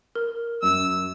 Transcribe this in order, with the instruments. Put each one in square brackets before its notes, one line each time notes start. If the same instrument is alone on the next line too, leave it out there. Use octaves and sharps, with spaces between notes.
[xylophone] A#4
[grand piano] F#2 [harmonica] E6